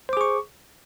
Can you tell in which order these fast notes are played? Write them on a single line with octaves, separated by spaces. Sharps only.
C5 D6 G#4 C#6